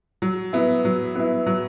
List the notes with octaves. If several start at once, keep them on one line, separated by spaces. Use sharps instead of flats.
F#3
B3 E4
F#3
B3 E4
F#3